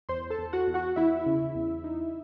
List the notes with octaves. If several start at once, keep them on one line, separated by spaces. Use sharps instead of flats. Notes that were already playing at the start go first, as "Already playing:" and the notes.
E2 C5 C6
A4 A5
E2
F#4 F#5
E2
F#4 F#5
E2 E4 E5
C#3
E2
D#4